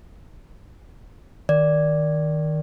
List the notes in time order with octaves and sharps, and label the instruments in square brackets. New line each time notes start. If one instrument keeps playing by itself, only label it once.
[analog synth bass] D#3 [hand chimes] D5